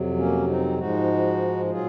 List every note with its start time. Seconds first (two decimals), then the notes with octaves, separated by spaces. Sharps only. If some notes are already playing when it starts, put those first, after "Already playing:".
Already playing: F2 C3 F#3
0.17 A#3 C#4
0.47 C4 D#4
0.78 G#2 F3 G#3 D#4 F#4
1.71 A#2 F#3 F4 G#4